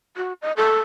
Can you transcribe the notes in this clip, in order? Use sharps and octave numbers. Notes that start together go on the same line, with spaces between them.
F#4
D#5
A4